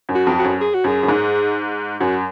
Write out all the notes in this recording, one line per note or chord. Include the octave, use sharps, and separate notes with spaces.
F#2
F#4
F2
F#4
F#2
G#4
F#4
F#2 G#4
F#2
G#2
F#2 F#4